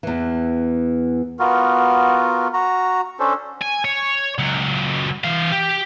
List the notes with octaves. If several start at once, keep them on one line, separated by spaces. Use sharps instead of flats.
E2 E3
B3 F4 F#4 A#4
F#4 A#5
C#4 D4 A4 C5
G#5
C#5
C#2 F#3
E3 F5
G4